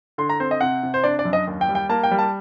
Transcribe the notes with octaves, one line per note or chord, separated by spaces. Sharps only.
D3 C6
A#5
C4 C5
D#5
C3 F#5
C3
C5
D4 D5
D5
F#2
D#5
D#2
G5
G3
G5
A#3 A5
G5
G3
A5